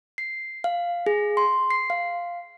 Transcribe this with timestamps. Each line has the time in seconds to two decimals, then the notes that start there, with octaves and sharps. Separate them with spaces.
0.18 C7
0.64 F5
1.06 G#4
1.37 C6
1.70 C7
1.90 F5